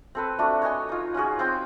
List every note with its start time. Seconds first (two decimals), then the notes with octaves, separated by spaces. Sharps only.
0.15 C4 A4 B4
0.38 A3 D4 F#4
0.62 C#5 D#5 G#5 C#6
0.89 D#4 F4
1.14 C#4 F4 F#4 G#4
1.39 C4 C5 G5 C6